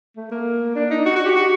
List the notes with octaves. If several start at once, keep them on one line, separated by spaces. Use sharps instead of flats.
A3
A#3
D4
D#4
F#4
F#4
G4
F#4